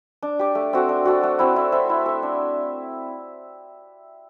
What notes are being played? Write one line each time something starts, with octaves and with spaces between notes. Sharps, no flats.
D4
G4 D5
A3
C4 F#4 A4
D4
F#4 A4
A3
C4 E4
E4
A4 C5 E5
E4
A4 E5
D4